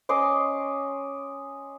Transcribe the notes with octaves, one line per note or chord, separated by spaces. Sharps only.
C#4 D#5 C6 D6